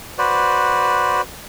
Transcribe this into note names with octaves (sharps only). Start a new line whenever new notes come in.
F#4 B4 C5 D5